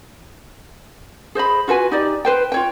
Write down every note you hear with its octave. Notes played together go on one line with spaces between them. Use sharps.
G#4 C5 D#5 B5
F4 F#4 B4 G#5
D#4 G4 D5
B4 C5 G5
F4 C#5 G5